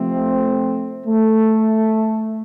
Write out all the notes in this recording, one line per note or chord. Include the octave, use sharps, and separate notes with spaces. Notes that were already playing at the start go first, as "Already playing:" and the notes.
Already playing: C3 F3 A3 C4
A3